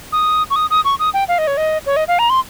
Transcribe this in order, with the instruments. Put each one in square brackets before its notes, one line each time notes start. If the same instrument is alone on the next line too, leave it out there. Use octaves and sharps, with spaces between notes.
[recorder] D#6
C#6
D#6
D#6
C#6
D#6
G5
F5
D#5
C#5
D#5
C#5
D#5
F5
A#5
C6